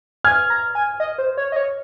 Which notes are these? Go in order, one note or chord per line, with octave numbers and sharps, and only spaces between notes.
G#5 F6 G#6
A#5
G#5
D#5
C5
C#5
D#5
C#5